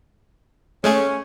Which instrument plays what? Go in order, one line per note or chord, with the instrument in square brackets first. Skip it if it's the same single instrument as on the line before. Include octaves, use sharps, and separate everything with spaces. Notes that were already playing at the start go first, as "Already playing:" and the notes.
[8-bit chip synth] G#3 A3 G#4 [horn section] C#4